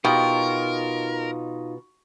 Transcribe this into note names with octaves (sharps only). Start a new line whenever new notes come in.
B2 D#4 F4 G4 A#4